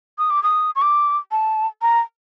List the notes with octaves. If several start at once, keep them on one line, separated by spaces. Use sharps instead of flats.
D#6
D6
D#6
C#6
D6
A5
A#5